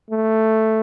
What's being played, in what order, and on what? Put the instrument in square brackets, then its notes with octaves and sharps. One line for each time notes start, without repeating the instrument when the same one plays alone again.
[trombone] A3